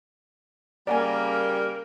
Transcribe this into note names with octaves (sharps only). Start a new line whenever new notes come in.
C#3 G3 A#3 A#4 D5 F#5 G#5